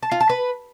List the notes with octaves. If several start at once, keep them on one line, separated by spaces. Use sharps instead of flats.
A5
F4
A5
B4